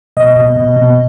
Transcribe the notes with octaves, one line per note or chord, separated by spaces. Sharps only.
B2 D#5
B2
B2
B2